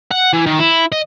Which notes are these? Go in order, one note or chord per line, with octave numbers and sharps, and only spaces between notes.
F#5
E3
D#3
E4
D#5